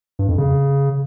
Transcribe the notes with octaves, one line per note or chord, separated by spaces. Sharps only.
G2
F2
C#3